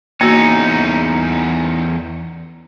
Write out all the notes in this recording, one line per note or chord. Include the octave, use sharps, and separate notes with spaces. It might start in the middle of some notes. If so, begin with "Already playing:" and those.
E2 A#3 C#4 D#4 F#4